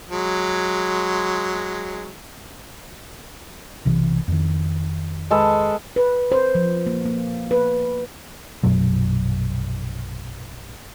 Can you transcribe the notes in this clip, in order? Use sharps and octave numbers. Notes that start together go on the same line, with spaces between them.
F#3 G#3
B1 C3 E3
F2 D#3
G#3 A4 B4
B4
C5
F3
A#3
A#3
B4
A#1 F#2 B2 F#3